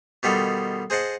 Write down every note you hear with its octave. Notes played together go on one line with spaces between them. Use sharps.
B2 D#3 G3 F4 A4
G#4 C5 D#5 F#5 A5